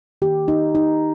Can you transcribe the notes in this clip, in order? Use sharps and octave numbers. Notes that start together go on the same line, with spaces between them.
D#3 A#3 G4
D#4
D#4